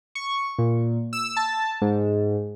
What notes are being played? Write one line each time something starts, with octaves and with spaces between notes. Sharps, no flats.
C#6
A#2
E6
A5
G#2